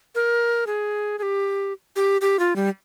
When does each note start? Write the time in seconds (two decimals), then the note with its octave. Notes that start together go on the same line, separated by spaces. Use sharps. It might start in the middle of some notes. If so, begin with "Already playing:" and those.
0.15 A#4
0.67 G#4
1.19 G#4
1.23 G4
1.96 G4
2.21 G4
2.39 F4
2.56 G3